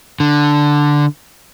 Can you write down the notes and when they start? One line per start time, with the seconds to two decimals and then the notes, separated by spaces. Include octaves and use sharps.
0.20 D3